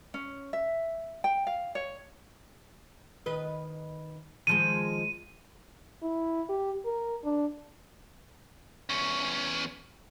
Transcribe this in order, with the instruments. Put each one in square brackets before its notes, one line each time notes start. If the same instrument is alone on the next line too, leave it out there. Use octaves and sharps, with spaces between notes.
[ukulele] C#4
E5
G5
F5
C#5
[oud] D#3 B4 D#5
[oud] D#3 F3 G#3 [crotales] D#7
[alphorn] E4
G4
A#4
D4
[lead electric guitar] E2 C#4